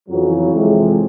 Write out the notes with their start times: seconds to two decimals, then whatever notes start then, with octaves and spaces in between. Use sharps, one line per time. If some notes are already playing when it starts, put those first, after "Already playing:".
0.09 F2 C#3 E3 F#3
0.53 F2 C3 E3 G#3